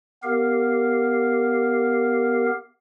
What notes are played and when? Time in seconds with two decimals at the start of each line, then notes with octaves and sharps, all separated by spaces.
0.23 B3 G4 A#4 F5